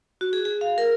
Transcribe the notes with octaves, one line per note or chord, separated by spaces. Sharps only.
F#4
G#4
G#4
F5
A#4